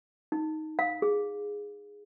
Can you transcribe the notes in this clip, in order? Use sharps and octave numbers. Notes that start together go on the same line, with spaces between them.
D#4
F5
G#4